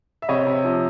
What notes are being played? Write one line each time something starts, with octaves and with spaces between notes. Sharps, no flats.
E5
C3 C#5 D#5
C3
F3